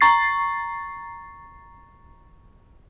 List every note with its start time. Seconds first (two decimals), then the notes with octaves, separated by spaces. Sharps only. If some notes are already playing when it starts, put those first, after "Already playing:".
0.01 A#5 C#6 A6 C7